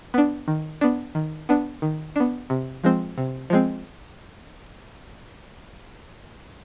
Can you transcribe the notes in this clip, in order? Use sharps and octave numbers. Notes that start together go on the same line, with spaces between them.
B3 D4
D#3
B3 D4
D#3
B3 D4
D#3
B3 D4
C3
F3 G#3 C4
C3
F3 G#3 C4